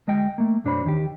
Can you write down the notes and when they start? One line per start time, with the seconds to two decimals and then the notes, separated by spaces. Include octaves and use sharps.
0.07 D2 G#3 D#5 G5
0.38 A3 A#3
0.64 B1 F#2 D4 C5 C#5 B5
0.85 D#2 D#3 G4